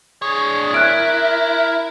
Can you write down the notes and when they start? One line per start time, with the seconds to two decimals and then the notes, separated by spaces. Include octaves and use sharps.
0.22 D4 G#4 C#5
0.74 E4 A#4 F#6 D7